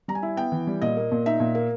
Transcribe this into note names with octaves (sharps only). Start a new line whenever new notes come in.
G3 A#5
G#5
E4
B3 G5
E3
G3
A#2 D#5
A#3
A#2
D#4 E5
A#2
A#3